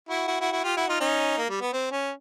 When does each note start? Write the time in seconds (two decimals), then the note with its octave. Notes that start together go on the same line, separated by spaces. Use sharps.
0.09 E4 F#4
0.28 E4 F#4
0.41 E4 F#4
0.52 E4 F#4
0.64 F4 G4
0.77 E4 F#4
0.88 D#4 F4
1.00 C#4 D#4
1.38 A#3
1.50 G3
1.61 B3
1.73 C4
1.92 C#4